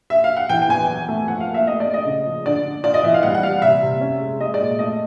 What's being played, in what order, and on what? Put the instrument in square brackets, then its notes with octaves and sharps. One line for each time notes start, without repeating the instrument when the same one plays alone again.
[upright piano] E5
F5
F#5
E3 G5
G5
E2 G#5
F#3
A3
F3 F#5
F5
A#3
E5
A3 D#5
D5
A3
D#5
C#3
F3
D3 D5
D3
F4 D5
D#5
E3 E5
F5
G3 F#5
F#5
G3 F5
C3 E5
C3
C#4
G#3
G#3 D#5
D5
A#2
A3 D#5